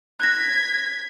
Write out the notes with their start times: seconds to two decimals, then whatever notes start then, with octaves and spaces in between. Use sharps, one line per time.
0.20 F#6 G#6 A#6 B6